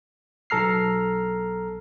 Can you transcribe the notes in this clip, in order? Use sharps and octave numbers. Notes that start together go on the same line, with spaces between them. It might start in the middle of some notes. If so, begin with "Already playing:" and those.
B1 A4 A#5 F6 C7